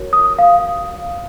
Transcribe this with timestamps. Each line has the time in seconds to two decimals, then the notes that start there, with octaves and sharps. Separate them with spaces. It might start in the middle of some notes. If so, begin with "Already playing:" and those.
Already playing: F#4 A#4 C#5
0.13 D#6
0.39 F5